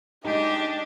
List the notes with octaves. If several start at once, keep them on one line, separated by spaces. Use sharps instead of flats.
G#3 D4 D#4 G4 D#5